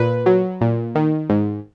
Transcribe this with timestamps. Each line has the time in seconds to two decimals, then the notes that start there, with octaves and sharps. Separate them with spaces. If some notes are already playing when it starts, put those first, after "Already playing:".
Already playing: A#2 B4
0.26 F#3
0.61 A#2
0.95 D#3
1.30 G#2